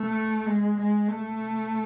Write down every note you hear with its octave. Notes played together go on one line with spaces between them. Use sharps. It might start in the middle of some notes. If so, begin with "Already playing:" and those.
Already playing: A3
G#3
G#3
A3